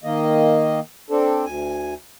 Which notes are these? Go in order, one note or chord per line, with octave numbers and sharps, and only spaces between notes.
D#3 A#3 D#5
C4 D4 A4
D2 G#5